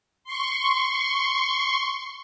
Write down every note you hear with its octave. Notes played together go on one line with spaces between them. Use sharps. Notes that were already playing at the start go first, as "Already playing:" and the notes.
C6 C#6